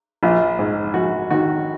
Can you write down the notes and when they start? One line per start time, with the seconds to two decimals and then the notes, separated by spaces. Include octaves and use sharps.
0.23 A#1 F4
0.59 G#2
0.94 A#1 F#4
1.30 D#3 F#4